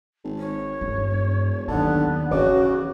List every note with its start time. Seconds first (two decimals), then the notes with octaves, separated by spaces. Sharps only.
0.24 G#1
0.38 C#5
0.81 E1 G2
1.68 D#2 D3 F#3 B3 D4 A5
2.31 C#3 E3 F#4 C#5 D6